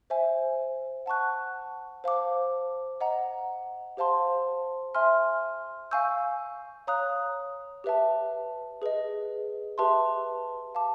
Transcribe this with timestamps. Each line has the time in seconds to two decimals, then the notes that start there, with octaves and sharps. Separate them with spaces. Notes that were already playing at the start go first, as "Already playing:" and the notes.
0.10 C5 E5 G#5
1.06 F#5 A5 C#6 F#6
2.04 C5 F5 A5 D6
3.01 D#5 F#5 A#5
3.97 G4 C5 F5 A5 C6
4.95 E5 G#5 C6 F6
5.91 F5 G#5 C#6 E6 G6
6.87 C#5 F5 A#5 D#6 F#6
7.84 G4 B4 E5 A5
8.82 G#4 B4 D#5
9.78 G4 B4 E5 A5 C6
10.75 F5 A5 D6